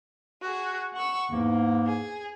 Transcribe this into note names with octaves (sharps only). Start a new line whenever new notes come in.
F#4 G#4
F#5 C#6 E6
E2 G#2 A#3
G#4